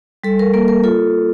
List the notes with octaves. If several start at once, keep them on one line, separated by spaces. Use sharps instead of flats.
G3 A4
A#4
A#3 A#4
A#4
F4 A4